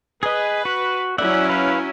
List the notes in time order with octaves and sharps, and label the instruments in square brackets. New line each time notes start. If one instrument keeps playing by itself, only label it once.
[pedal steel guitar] G#4 D#5 [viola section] B4
[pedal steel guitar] F#4
[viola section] F#3 C#4 E4 [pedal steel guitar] D5 E5 F#5
[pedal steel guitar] B4 F5